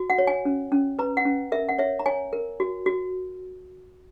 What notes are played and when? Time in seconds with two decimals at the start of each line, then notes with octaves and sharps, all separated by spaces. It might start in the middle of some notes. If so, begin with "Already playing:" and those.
Already playing: F#4
0.10 F#5
0.18 C#5
0.27 G#5
0.45 C#4
0.72 C#4
0.99 B4 A#5
1.17 F#5
1.25 C#4
1.52 A#4 E5
1.69 F#5
1.79 C#5 E5
1.99 A#5
2.06 C#5 G#5
2.33 A#4
2.60 F#4
2.86 F#4